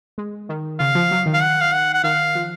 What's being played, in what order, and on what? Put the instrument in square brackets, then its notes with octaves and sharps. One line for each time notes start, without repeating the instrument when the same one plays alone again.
[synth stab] G#3
D#3
[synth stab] C#3 [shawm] F5
[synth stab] F3
F#3
D#3
[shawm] F5
F#5
F5
F#5
F#5
[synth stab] D#3 [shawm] F5
[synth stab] F3